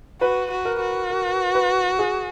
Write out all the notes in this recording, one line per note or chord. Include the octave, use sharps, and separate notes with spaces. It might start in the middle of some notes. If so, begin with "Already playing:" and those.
F#4 B4
F#4
A#4
F#4
A#4
B4
G#4